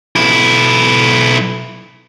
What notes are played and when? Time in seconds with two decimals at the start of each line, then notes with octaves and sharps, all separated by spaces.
0.15 B1 E4